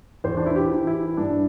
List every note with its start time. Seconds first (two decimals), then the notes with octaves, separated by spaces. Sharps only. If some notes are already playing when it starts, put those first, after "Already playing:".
0.24 E2 C5
0.37 D4
0.46 E4
0.56 G4
0.71 E3
0.87 E4
1.17 G2 D4